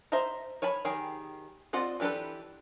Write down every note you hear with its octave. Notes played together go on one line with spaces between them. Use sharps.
C5 D#5 E5 A5 A#5
C#5 G#5 A5 B5
D#3 G4 G#4 G5
C4 F4 D5 D#5 F#5
E3 D4 G4 A4 B4